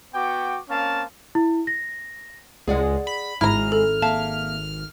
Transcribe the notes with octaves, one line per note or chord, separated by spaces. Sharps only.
B3 F#4 G5 D6
A#3 C4 C#4 F5 A5
E4
A#6
C#2 G#3 G#4 D5 F#5
B5
G#1 G#2 G#3 E4 A#5 F6
A4
A#3 E5 F5 A5